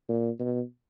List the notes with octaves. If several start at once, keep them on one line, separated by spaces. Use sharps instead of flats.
A#2
B2